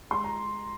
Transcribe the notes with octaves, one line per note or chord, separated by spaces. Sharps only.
G#3 C6
A#5